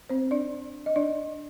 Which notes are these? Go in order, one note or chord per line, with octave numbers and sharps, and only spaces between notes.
C4 C5
D4 D5
D#5
D4 D5